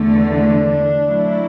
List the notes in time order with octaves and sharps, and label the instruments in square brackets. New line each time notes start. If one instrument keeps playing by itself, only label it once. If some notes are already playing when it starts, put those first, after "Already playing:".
Already playing: [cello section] E2 D3 A3
[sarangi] D4
[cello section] F#3 A3 E4